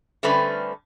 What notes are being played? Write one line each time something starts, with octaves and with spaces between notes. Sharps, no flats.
D3 G3 A3 C4 C#4 B4